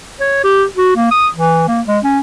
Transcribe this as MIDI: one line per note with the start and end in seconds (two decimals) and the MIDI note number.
0.20 0.42 73
0.44 0.64 67
0.77 0.93 66
0.96 1.09 58
1.11 1.27 87
1.34 1.64 52
1.68 1.81 58
1.87 1.98 56
2.04 2.19 61